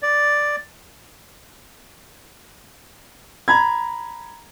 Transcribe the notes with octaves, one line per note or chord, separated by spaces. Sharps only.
D5
A#5 B5 G#6